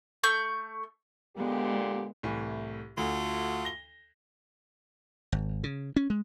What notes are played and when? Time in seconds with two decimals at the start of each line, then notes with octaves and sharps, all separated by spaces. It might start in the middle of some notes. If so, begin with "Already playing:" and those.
0.24 A3 C#6 G6
1.37 A#2 D3 G#3 B3 G4
2.23 C2 A2 E3
2.97 D2 A3 F4 F#4
3.65 A#6 G7
5.32 G#1
5.64 C#3
5.96 C#4
6.10 G#3